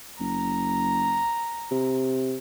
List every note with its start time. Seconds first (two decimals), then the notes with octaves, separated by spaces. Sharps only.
0.20 F#1 A#5
1.71 C3